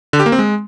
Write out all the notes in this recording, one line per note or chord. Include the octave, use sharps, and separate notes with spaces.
D3
G4
A#3
C4
G#3